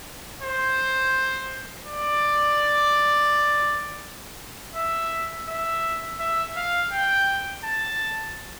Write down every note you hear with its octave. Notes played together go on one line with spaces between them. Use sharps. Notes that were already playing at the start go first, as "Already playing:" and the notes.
C5
D5
E5
E5
E5
F5
G5
A5